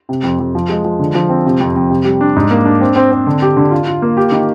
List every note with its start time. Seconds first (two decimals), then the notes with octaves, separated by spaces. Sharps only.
0.09 C3
0.24 F2
0.39 F2
0.55 F3
0.69 G#3
0.84 F3
0.99 D3
1.15 F3
1.29 C4
1.46 C3
1.60 F2
1.76 F2
1.90 C3
2.05 G3
2.21 D4
2.36 G#2
2.51 A#3
2.65 D4
2.81 C4
2.96 C4
3.12 C4
3.27 D3
3.42 G4
3.57 D3
3.71 F4
3.87 F4
4.02 A#3
4.17 G4
4.32 D#3